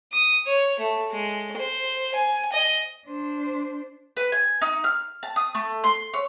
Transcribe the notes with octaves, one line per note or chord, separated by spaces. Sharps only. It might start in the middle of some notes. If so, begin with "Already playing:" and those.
D#6
C#5
A3
G#3
C5
G#5
D#5
D4 C5
B4
G#5
D#4
F6
A5
D#6
A3
C6
C#5